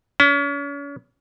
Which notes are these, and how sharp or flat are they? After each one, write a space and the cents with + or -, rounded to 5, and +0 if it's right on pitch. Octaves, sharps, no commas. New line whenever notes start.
C#4 +40